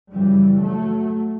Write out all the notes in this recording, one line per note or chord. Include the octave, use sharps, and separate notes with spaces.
F#2 C#3 E3 G3
F#3 A3